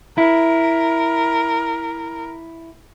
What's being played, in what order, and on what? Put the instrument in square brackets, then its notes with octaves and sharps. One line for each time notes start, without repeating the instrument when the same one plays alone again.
[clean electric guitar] E4 [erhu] A#4